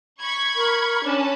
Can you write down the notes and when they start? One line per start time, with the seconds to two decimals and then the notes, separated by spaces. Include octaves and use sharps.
0.18 B5 C#6 G#6
0.56 A#4
1.04 C#4 D4 A5 B5